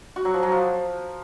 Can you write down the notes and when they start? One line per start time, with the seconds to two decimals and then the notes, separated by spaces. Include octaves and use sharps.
0.16 F#4
0.25 F#3
0.34 F3
0.43 F#3
0.52 F3